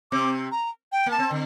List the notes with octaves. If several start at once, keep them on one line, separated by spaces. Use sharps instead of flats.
C3 C4 D6
A#5
G5
A#3 A5
C4
D3